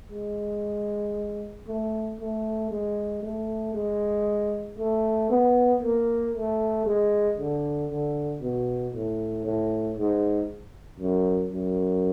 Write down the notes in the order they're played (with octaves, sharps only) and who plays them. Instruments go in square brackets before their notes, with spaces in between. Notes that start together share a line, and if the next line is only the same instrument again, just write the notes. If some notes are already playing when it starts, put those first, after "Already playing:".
[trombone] G#3
A3
A3
G#3
A3
G#3
A3
B3
A#3
A3
G#3
D3
D3
B2
A2
A2
G#2
F#2
F#2